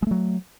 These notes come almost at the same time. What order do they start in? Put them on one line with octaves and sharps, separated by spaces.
G#3 A3 F#3